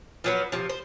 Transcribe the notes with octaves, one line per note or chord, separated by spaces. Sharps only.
F3 F#3 B3
C3 F3
C5